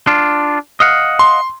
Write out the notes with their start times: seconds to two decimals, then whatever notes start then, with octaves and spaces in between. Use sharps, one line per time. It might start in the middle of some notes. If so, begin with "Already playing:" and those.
0.07 D4 F4
0.80 D#5 F5 F#5
1.19 C6